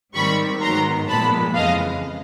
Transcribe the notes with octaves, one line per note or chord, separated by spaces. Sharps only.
G#2 D#3 G3 C4 B5 C#6
G#2 D#3 F#3 B3 A#5 C6
A#2 F3 G#3 B3 A5 B5
F2 C#3 E3 G#3 D#5 F5